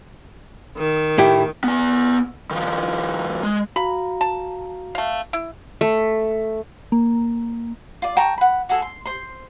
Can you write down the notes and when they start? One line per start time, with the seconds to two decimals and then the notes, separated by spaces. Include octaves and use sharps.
0.78 D#3
1.18 A2 E4 G4
1.64 B3 G#5
2.51 D#3 F3
3.43 G#3
3.76 F#4 F5 A#5 B5
4.21 A5
4.95 A3 F5
5.33 E4
5.81 A3
6.92 A#3
8.02 F4 D5
8.17 G5 A5 A#5 C#6
8.38 F#5 B5
8.69 F#4 G#4 A4 G#5
8.82 C6
9.06 C5 C6